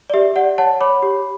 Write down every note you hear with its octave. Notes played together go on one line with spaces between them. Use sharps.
D5
G4 E5
G4 D5 F#5
C#5 F#5 A5
C#5 B5 D6
G4